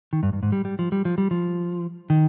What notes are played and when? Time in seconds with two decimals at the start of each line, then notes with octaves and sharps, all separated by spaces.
0.13 D#3
0.23 G2
0.33 G2
0.43 G#2
0.52 G3
0.65 G3
0.79 F3
0.92 G3
1.05 F3
1.18 G3
1.31 F3
2.10 D#3